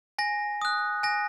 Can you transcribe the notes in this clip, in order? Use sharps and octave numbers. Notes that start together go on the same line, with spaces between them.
G#5 A#6
D#6 F#6
G#5 A#6